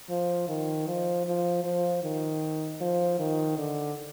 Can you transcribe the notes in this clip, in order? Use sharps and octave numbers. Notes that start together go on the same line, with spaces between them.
F3
D#3
F3
F3
F3
D#3
F3
D#3
D3